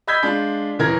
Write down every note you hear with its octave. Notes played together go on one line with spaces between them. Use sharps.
D#5 B5 E6 G6 G#6 B6
G#3 D4 F4
D#1 E3 A#4 G#6 A#6